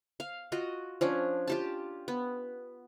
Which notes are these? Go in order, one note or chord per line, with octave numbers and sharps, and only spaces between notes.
F5
F4 F#4 D#5
F3 C#4 D4
F4 G4 A5
B3